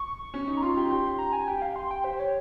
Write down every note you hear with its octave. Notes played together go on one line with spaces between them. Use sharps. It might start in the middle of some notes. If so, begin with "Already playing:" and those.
Already playing: C#6
C#4
D#4
A#5
F4 C6
G4
G4
A#5
G#5
G4 G5
F5
C6
G5
G4 C5
C#5